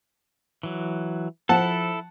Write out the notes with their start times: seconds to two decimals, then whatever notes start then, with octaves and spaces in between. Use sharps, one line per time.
0.63 E3 F#3
1.49 F3 E4 A4 F#5 A5